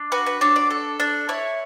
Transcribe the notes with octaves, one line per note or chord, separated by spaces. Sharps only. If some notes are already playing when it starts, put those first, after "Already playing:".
Already playing: D4
F#4 B4
B4
D4 C#5
D5
A4
D4
E4 C#5